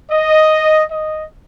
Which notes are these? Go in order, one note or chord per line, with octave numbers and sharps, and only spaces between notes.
D#5
D#5